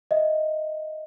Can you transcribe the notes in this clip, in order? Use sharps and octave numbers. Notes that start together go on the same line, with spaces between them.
D#5 E5